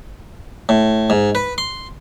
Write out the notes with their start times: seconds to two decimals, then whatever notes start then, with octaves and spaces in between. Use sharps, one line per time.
0.69 A2
1.10 G#2
1.35 B4
1.58 C6